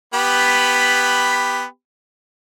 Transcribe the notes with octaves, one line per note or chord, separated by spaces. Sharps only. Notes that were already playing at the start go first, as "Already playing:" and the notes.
B3 G4 B5